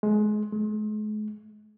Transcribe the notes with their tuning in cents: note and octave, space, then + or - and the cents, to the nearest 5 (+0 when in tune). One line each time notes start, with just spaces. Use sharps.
G#3 +25
G#3 +40